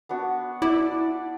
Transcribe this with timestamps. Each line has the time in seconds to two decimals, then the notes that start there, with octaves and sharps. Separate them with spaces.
0.09 B3 D4 F#4
0.62 E4 D5